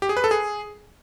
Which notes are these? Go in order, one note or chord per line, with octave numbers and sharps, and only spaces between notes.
G4
G#4
B4
A4
G#4